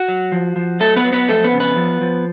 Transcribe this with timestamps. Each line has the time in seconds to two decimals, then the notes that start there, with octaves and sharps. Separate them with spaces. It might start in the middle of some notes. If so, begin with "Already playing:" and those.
Already playing: F#4
0.08 F#3
0.32 F3
0.56 F3
0.80 F#3 A3 A4
0.96 B3 B4
1.05 F#3
1.13 B3 B4
1.28 F2 A3 A4
1.44 B3 B4
1.53 C#3
1.60 B3 B4
1.76 F3
2.01 F3